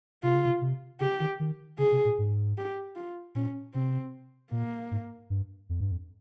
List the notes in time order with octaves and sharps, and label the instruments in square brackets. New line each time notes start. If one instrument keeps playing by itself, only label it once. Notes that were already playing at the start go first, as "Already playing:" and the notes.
[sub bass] C3 [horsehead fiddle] F4
[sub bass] C#3
C3
C3
[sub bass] C#3 [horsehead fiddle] G4
[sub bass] D#3
D#3
[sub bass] C#3 [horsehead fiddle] G#4
[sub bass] C3
A#2
G#2
[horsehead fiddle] G4
F4
[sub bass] A#2 [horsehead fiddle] C#4
[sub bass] C3 [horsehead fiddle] C4
[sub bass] A#2 [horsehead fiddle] A#3
[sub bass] G#2
G2
F2
G2
F2